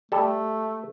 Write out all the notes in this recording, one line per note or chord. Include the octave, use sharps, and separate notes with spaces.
G3 A3 A4